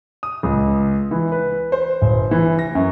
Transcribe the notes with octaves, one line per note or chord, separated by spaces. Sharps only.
D#6
C#2
E3
B4
C5
G1
E3
A#6
F#2